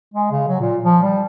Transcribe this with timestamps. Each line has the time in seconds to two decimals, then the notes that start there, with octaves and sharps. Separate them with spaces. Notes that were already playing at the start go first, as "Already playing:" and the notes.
0.14 G#3
0.31 C#3
0.48 F#3
0.60 A#2
0.84 F3
1.02 G3